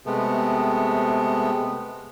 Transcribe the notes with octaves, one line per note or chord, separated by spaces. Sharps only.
C3 G#3 A3 B3